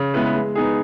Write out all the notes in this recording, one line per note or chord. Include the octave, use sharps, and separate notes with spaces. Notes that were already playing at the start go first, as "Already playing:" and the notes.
Already playing: C#3
G#3 B3 E4 B4
G#3
B3 D#4 G#4